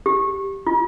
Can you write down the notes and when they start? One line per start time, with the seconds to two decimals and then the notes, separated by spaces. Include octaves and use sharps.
0.06 G4
0.67 F4